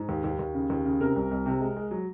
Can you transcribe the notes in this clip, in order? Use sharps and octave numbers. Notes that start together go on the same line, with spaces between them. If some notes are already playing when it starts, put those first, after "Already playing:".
Already playing: G#2
D#2
D#2
D#2
C#3
D#2
C#3
C3 A#4
C2
C2
C3
G#3
G#3
F#3